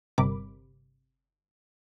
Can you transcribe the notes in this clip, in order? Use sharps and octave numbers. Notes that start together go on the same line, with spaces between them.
G1 C3 G3 A#4 B5 D6